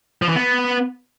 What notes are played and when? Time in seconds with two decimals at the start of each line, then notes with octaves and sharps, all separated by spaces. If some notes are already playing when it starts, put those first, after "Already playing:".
0.22 F3
0.29 E3
0.36 B3